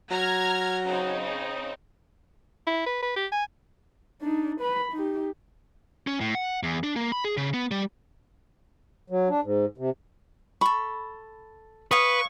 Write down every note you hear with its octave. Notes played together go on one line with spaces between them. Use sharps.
F#3 A#5 F6 G#6
C#3 C4 D#4
E4
B4
B4
G4
G#5
D4 D#4
B4 B5
D#4 G4
C#4
A2
F#5
E2
D4
A#3
B5
G#4
C#3
B3
G3
F#3
D4
G#2
C3
A4 B5 C#6
B4 C#5 F5 C#6 D#6